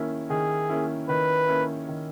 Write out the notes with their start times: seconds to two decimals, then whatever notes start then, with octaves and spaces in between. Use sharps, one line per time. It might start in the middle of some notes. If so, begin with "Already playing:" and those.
Already playing: D#3 A#3 C#4 E4
0.30 D#3 G#4
0.69 A#3 C#4 E4
1.09 D#3 B4
1.48 A#3 C#4 E4
1.89 D#3